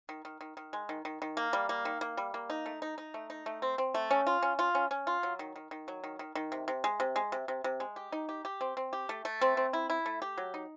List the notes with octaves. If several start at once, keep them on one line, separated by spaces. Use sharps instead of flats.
D#3
D#3
D#3
D#3
G#3
D#3
D#3
D#3
A#3
G3
A#3
D#3
A#3
G3
A#3
D#4
A3
D#4
D#4
A3
D#4
A3
C4
C4
A3
C#4
F4
C#4
F4
C#4
C#4
F4
F#3
D#3
D#3
D#3
F#3
D#3
D#3
D#3
C3
C3
G#3
C3
G#3
C3
C3
C3
G#3
G4
D#4
G4
G4
C4
C4
G4
A3
A3
C4
C4
E4
E4
A3
G4
F#3
D#4